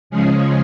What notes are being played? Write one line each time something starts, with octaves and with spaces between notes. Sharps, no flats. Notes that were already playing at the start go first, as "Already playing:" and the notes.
C#3 F3 G#3 C#4 G#4